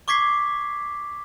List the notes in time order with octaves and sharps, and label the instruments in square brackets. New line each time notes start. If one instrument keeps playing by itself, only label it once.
[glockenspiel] C#6 D6 G#6 B6 C7